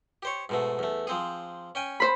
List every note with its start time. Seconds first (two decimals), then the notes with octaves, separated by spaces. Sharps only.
0.23 G4 C5 C#5
0.49 G#2 B2 A3
0.79 E2 A3
1.07 F3 C4 G#4
1.75 C#4 G5 G#5
2.00 C5 B5